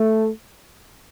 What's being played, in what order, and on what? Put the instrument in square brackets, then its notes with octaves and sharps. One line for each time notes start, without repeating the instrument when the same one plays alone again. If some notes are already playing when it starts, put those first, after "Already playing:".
Already playing: [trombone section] A3